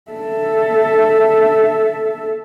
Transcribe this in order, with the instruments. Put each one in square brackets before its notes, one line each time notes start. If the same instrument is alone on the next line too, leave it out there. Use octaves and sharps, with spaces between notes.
[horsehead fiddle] A4 E5